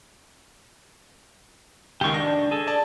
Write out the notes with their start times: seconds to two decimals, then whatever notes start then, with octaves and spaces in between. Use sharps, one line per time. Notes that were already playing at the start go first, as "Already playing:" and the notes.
2.01 C#2 D#3 G4 C#6
2.14 D4 A#6
2.51 G#4 A4
2.67 D5 A5